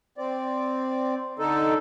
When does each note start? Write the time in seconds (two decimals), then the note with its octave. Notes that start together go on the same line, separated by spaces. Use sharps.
0.18 C4 D5
1.39 D3 D#4 A4